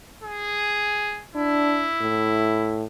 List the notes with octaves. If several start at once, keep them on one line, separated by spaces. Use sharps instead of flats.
G#4
D4 E4
A2